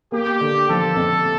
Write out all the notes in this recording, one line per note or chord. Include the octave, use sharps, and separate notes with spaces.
A#3 G4
D3
F3 A4
F2